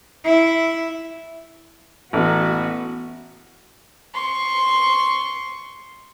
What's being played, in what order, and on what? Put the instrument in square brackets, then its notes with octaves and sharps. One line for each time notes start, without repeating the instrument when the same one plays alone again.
[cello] E4
[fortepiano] A1 [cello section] B3 F#4
[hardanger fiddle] C6 C#6